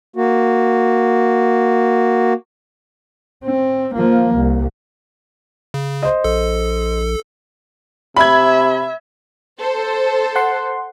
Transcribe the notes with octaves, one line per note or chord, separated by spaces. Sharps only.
A#3 F#4
C4
F3 A#3
C2
C#3
C5 D#5
A#1 A4
C3 E5 B5 G#6
A4 C5
F#5 C6